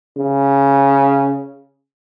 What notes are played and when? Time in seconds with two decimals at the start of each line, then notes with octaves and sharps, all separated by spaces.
0.17 C#3